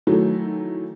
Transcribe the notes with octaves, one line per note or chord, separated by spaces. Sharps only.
D#3 E3 F#3 A3 E4